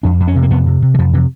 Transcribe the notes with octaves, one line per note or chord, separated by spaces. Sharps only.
F2 D4
F2
C#4
C3
A#3
F2 B3
C3
C3
E3
F2 F3
C3 E3